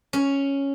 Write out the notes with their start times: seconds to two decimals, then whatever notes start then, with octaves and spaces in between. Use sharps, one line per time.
0.13 C#4